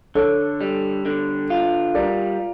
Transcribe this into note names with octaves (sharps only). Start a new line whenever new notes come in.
D3 A4 C#5
G3
D3
F4
G3 A#4 D5